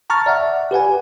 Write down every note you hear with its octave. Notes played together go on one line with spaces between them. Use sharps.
A5 A#5 C#6 F6 A6
D5 E5 F#5
G4 B4 F#5 G#5